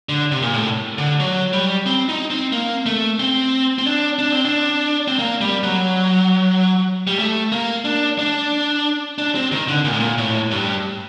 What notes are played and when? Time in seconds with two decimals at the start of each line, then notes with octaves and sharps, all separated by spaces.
0.09 D3
0.32 C3
0.42 A#2
0.53 A2
0.98 D3
1.20 F#3
1.53 G3
1.86 C4
2.09 D#4
2.31 C4
2.52 A#3
2.86 A3
3.20 C4
3.78 C4
3.86 D4
4.19 D4
4.32 C4
4.45 D4
5.08 C4
5.19 A#3
5.41 G3
5.63 F#3
7.07 G3
7.18 A3
7.52 A#3
7.85 D4
8.19 D4
9.18 D4
9.35 C4
9.52 D#3
9.68 D3
9.85 A#2
9.93 A2
10.00 A#2
10.18 A2
10.51 G2